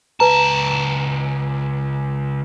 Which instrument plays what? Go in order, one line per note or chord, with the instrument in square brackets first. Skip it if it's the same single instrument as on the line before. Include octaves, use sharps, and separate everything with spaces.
[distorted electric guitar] C#2 A5 [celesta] B4 A#5